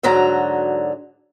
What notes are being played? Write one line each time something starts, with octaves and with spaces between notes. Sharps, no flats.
D2 G#2 D3 F#3 A#5